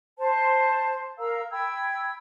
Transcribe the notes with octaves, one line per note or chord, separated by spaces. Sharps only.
C5 A5
A#4 F5 A#5 E6
G5 B5 E6 G#6